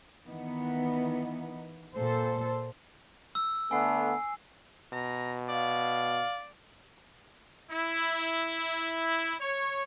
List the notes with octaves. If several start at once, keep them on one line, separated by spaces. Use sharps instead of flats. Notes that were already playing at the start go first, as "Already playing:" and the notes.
D#3 E3 B3 D#4
A#2 A4 C5
E6
D3 A3 B3 G#5 C7
B2 A#5
D5 F5
E4
C#5